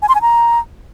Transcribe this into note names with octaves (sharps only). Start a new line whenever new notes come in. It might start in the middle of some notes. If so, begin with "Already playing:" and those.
G#5
C6
G#5
A#5